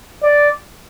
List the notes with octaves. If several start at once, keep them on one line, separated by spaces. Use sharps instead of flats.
D5